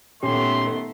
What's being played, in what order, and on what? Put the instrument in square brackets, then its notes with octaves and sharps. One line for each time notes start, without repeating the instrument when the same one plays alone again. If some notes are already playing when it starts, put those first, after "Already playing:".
[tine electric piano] A#2 C#4 G4 [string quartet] D#3 A3 B3 [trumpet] C6